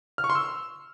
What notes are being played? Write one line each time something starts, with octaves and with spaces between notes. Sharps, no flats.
F6
C#6
C6
E6